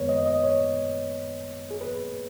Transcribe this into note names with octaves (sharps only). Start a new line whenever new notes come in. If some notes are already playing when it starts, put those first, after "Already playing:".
Already playing: F#2 D#3 G#3 B3 B4 C#5
D#5
D#5
C#5
G#4
B4